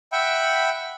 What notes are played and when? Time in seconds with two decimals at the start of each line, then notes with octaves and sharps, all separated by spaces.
0.12 E5 F#5 G5 B5